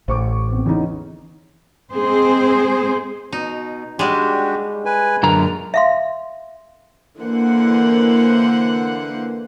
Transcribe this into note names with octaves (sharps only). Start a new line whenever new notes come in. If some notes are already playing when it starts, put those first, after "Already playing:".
A1 C5 C#6 D6
B3 C4
E2 C#4 D#4
G#3 C4 G#4 C5
B2 D#4
G3 G#3 D4 F#4 G4
B4 G#5
F#2 A#2 D3 A#4 A#5
E5 F5 C6
D3 E3 A#3 C5 F#5